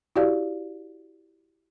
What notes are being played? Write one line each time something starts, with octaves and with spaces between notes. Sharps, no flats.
E4 F#4 G4 D5 F5